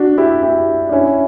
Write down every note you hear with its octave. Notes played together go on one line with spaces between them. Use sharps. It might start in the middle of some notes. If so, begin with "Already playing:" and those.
Already playing: D4 F#4
E4 G4
E4 G4
D4
C#4 E4